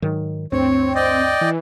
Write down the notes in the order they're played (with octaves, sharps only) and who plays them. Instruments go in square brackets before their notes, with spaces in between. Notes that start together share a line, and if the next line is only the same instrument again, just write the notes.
[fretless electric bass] G#2 D#3 F#3
[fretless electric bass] D2 G2 [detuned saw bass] C4 [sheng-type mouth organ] C#5
[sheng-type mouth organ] D5 D#5 G5
[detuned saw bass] E3